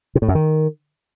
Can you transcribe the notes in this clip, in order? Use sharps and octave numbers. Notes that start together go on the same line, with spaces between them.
C3
A2
F#2
D#3